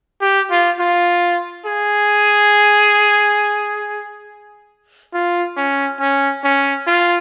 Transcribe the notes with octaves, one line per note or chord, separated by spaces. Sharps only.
G4
F4
F4
G#4
F4
C#4
C#4
C#4
F4